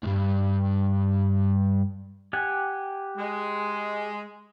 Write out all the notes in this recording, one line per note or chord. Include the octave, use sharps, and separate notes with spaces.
C#2 G2
G4 F#5 G#5
G#3